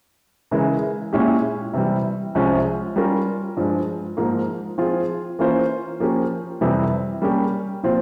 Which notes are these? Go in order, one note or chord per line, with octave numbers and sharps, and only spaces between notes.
C#3 E3 G#3 E4 A#4
A#2 G#3 C#4 E4 G4
C3 E3 G3
C2 C3 F3 G#3 C#4
G3 C#4 F4 A#4
G2 F3 G#3
G#2 F3 A#3
F3 C4 F4 G#4
E3 A#3 C#4 F4 C5
F3 A#3 C#4 G4
F2 C3 E3 G3
G3 A#3 C#4 G4
A#2 F3 C4 F4